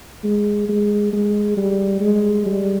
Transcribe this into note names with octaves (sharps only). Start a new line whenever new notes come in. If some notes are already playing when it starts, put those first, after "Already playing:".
G#3
G#3
G#3
G3
G#3
G3